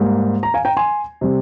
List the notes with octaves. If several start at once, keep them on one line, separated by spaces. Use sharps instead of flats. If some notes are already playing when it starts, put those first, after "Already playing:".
Already playing: G#2 G3 A#3
A#5
F5 G#5
G5 A#5
G#5 C6
C3 G3